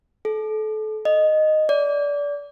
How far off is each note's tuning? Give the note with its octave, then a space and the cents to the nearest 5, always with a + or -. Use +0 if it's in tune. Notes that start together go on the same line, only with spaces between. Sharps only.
A4 -30
D#5 -10
D5 -25